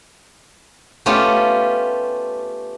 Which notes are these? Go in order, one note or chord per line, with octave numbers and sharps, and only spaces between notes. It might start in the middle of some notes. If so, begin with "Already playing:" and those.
A3 B3 C#4 F4 G4